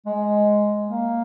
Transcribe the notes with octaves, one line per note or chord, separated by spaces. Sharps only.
G#3
A#3